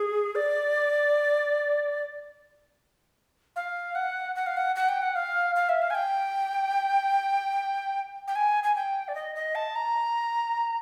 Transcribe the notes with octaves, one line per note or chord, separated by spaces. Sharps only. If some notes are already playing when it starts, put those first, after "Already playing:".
Already playing: G#4
D5
F5
F#5
F#5
F5
F#5
F#5
G5
F#5
F5
F5
E5
F5
G#5
G5
G5
G#5
G#5
G5
D5
D#5
D#5
A5
A#5